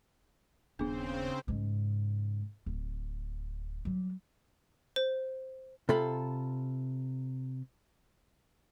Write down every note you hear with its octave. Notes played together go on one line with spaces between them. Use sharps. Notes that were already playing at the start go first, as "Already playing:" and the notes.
D#1 C#3 B3 C4 D4 G#4 C5
G#2 C#3
D1
F#3 G3
C5
C3 F4 A4 B5